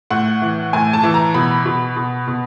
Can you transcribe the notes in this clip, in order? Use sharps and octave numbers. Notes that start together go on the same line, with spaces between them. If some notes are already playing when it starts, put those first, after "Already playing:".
A2 F#5
E3
A2 G#5
A5
E3
A#5
B2 B5
B2
B2
B2